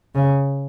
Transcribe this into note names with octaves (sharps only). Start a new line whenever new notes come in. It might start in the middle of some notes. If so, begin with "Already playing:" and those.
C#3